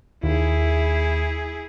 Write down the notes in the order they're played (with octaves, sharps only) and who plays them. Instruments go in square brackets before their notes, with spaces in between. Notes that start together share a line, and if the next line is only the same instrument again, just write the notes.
[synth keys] D#2 [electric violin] E4 G#4